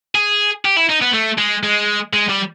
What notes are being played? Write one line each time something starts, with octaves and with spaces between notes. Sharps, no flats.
G#4
G4
E4
D#4
B3
A3
G#3
G#3
G#3
G3